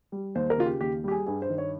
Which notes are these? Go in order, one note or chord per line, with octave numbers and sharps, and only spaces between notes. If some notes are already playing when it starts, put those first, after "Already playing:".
G3
D#2 C5
A#4
C#3 F4
G4
D#2 G4
G3 G4
G#4
G2 G#4
C5
D#3
C#5